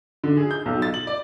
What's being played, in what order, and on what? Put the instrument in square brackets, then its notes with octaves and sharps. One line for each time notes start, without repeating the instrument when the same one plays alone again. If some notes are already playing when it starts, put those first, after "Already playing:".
[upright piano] D3
G#4
G6
B1
A6
F#7
D5